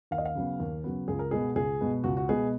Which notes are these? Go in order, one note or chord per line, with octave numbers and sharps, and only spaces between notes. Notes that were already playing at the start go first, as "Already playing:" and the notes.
D#2 F5
D#5
F5
C#3 F#3 B3
D#2
C#3 F#3 B3
C#2 G#4
A#4
B2 G#3 B3 G#4
C#2 G#4
B2 G#3 B3
C#2 F#4
F#4
B2 G#3 B3 G#4